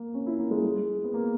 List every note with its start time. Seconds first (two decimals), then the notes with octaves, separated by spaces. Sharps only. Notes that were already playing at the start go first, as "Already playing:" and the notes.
Already playing: A#3
0.14 C#4
0.26 E4
0.39 A#3
0.51 G#3
0.65 G#3
1.04 B3
1.14 A#3